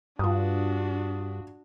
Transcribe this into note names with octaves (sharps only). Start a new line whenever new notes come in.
G2 D4 F4 F#4 D#6